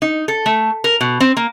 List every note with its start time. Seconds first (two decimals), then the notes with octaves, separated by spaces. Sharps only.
0.02 D#4
0.28 A4
0.46 A3
0.84 A#4
1.01 B2
1.20 C4
1.37 A#3